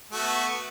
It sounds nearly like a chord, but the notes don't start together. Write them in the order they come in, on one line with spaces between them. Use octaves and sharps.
A3 F#4 B3